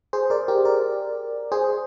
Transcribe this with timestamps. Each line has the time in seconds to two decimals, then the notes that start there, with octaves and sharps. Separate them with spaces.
0.13 G#4 C5
0.30 A#4 D5
0.48 G4 A#4
0.65 A#4 D5
1.52 G#4 C5